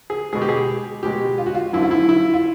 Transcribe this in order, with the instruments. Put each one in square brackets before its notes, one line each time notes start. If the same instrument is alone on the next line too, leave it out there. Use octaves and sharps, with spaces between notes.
[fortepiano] G#4
B2 G#3 G#4
G4
G#4
B2 G#3 G4
F4
F#4
F4
F#2 D3 F3 E4
F4
E4
E4
F4